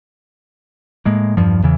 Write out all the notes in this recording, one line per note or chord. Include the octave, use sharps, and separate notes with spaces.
A2 G#3 A#3
E2 G2 F3
E2 C#3 E3